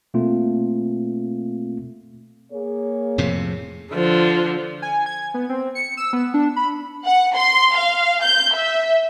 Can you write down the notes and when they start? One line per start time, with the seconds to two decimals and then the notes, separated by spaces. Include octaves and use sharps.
0.14 B2 A3 A#3 C4 F4
2.53 A#3 G#4 C#5
3.18 F2 A2 C3
3.93 D3 F3
4.82 G#5
5.06 G#6
5.34 B3
5.49 C4
5.75 C#7
5.97 E6
6.13 B3
6.34 D4
6.56 B5
7.05 F#5
7.35 C6
7.76 F5
8.23 G6
8.55 E5